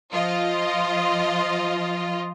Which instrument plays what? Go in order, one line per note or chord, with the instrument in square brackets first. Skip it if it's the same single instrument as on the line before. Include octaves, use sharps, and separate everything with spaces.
[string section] F3 F4 D#5